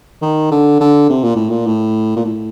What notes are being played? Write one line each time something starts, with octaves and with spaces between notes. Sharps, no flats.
D#3
D3
D3
C3
A#2
A2
A#2
A2
A#2
A2